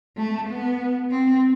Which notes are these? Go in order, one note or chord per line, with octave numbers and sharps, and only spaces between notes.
A3
B3
C4